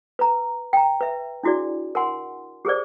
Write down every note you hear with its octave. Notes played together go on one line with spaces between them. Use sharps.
B4 A#5
G5 A#5
B4 E5
D4 E4 F#4 G#4 D5
A#4 F#5 G#5 C6
G4 G#4 A#4 C5 D5